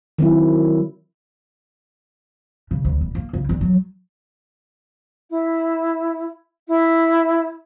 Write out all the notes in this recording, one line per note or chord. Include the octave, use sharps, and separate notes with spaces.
D#3 F#3 C4 E4
C#3
D2
D#1
A#3
C#2
D2
F#3
E4
E4